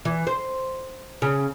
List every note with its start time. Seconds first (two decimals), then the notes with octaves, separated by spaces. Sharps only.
0.05 E3
0.27 C5
1.22 C#3